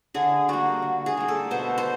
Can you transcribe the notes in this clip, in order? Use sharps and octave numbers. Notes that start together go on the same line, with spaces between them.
D3 G#4
G3 A#3 F#4
D3
G#4
G3 A#3
A4
B2 C5
C5